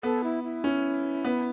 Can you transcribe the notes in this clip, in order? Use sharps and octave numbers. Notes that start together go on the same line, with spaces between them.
B3 A4
E4
E4
C#4
B3